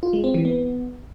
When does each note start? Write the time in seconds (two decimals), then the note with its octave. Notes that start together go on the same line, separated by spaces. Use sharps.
0.03 F4
0.13 G#3
0.24 C4
0.34 E3
0.45 B3